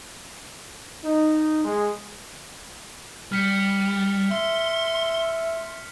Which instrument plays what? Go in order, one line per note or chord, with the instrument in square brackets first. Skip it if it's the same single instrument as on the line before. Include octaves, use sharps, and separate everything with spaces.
[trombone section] D#4
G#3
[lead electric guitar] G3 [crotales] F6 B6 C#7
[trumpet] E5 [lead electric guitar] C6